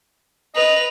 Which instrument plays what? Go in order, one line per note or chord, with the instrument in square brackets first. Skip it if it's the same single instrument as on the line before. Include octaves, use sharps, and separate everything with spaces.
[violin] B4 F7 [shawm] D#5